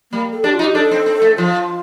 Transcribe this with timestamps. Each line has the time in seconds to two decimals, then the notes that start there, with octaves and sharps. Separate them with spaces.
0.12 G3 A#3
0.33 A4
0.44 D4 G4
0.54 F4
0.59 D#4
0.64 G4
0.75 D4 A4
0.91 C4
1.06 C4
1.22 A3
1.38 F3 F4